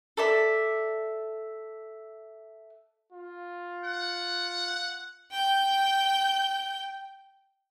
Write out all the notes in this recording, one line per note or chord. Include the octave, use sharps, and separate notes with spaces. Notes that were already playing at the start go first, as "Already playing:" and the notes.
A4 D5 E5
F4
F#5
G5 G6